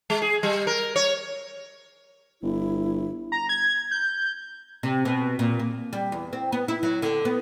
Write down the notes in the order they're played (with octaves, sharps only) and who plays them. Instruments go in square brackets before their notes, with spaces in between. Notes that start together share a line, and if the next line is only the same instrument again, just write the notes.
[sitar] G#3
G#4
G3
A#4
C#5
[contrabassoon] G1 [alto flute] E4
[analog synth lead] A#5
G#6
G6
[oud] C3
B2
A#2
A#3
G3
E2
C4
B3
E4
F#3
D3
B3